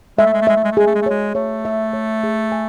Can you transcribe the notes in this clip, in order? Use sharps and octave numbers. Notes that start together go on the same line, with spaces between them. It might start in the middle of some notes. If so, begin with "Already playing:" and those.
G#3 E5
A3
G#3
A3
G#3 E5
A3
G#3
A3
G#3 G#4
A3
G#3
A3
G#3 C#5
A3 C#5
E5
C#5
G#4
G#5